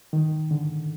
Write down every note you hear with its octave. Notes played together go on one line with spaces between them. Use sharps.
D#3
D3